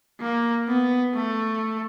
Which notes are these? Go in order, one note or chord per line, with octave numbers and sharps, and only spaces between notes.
A#3
B3
A3